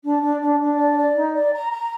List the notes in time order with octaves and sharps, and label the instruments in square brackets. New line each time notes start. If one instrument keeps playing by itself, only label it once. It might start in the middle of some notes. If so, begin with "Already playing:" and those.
[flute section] D4
D4
D4
D4
D5
D5
D#4
D5
A#5
A#5